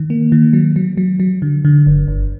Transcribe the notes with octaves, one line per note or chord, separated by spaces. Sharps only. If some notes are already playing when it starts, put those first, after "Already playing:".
Already playing: D#3
A#3
D#3
F#3
F#3
F#3
F#3
D3
D3
G1
G1